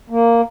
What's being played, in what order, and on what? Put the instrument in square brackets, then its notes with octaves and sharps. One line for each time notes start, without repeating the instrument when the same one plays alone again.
[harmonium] A#3